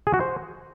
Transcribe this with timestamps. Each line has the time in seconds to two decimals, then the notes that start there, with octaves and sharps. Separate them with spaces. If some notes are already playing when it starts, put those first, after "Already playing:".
0.07 G#4
0.14 F#4
0.20 C5